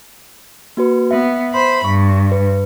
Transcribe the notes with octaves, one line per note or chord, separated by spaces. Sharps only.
A#3 F#4 B4
B3 E5
C5 B5
G2 C#6
B4